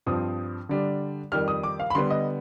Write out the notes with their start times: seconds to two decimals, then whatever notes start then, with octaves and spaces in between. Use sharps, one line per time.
0.06 G2 F3 C4 D#6
0.69 D3 G3 D4
1.32 F2 D#3 G3 F6
1.48 D#6
1.63 D6
1.80 F5
1.90 B5
1.95 D3 G3 B3 C6
2.10 D#5